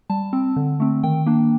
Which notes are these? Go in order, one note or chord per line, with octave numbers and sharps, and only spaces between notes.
G3 A5
C4
D3
A3 C4
D#3 G5
A#3 D4